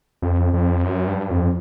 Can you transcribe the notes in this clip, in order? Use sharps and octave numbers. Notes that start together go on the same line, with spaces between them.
F2
F2
F#2
G2
F2